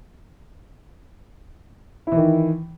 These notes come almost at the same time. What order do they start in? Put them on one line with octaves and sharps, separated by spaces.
E4 E3 D#3